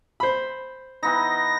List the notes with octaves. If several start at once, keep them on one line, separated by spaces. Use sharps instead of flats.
C5 B5
E3 B3 D#4 A#6